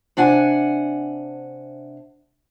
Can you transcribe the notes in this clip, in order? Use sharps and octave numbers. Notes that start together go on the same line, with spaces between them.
C3 D4 F#5 G#5